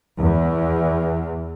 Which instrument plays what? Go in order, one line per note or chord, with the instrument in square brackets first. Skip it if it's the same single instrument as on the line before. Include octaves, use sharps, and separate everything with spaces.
[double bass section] E2